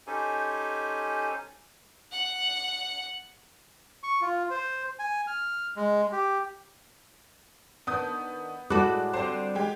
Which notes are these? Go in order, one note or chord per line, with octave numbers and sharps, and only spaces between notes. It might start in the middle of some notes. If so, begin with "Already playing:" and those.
C#4 D#4 G4 A4 C5 G#5
F#5
C#6
F4
C5
G#5
F6
G#3
G4
D#3 B3 D4 D#6 G6
A2 G#3 F#4 A4 D5 B5 D6 F#6
D3 G3 C4 C5 E7
G#3 G4